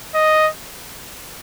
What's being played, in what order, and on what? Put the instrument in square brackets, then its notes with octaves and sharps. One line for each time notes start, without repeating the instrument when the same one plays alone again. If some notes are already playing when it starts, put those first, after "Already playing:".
[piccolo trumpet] D#5